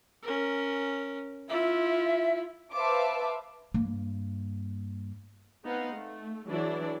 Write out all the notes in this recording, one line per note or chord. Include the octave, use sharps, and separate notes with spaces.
C#4 A#4
E4 F4 E5
B4 C5 E5 F5 A5 D6
G2 A#3
B3 C4 D#4 F5 F#5
A3
E3 F#3 D4 E4 G#4 D5